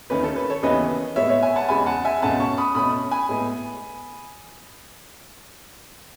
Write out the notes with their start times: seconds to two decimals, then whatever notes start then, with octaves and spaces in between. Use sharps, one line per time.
0.10 D#2 D#3 A3 C#4 B4
0.23 A4
0.36 B4
0.50 A4 C#5
0.63 D#2 C#3 E3 B3 B4 D#5
1.16 A2 G#3 B3 C#5 E5
1.29 C#5 E5
1.43 E5 G#5
1.56 F#5 A5
1.69 E2 C#3 G#3 G#5 B5
1.86 F#5 A5
2.05 E5 G#5
2.22 C#2 B2 A3 C#4 F#5 A5
2.40 A5 C#6
2.58 B5 D#6
2.75 B2 A3 C#4 B5 D#6
3.11 G#5 B5
3.29 A2 G#3 B3